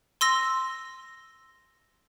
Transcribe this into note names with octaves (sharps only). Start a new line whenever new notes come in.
C6 E6 A#6